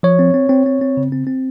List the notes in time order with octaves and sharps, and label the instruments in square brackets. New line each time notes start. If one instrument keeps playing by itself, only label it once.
[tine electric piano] F3 C#5
C4
C4
C4
C4
C4
C#3
C4
C4